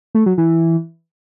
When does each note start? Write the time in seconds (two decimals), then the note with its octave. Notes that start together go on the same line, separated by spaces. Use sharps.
0.15 A3
0.26 F#3
0.38 E3